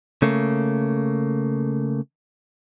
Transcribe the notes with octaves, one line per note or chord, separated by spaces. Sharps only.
C#3 A3 A#3